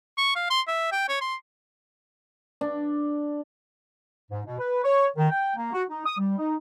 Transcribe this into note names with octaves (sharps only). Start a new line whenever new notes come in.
C#6
F5
C6
E5
G5
C#5
C6
D4
G#2
B2
B4
C#5
D#3
G5
A#3
F#4
D#4
D#6
G3
D#4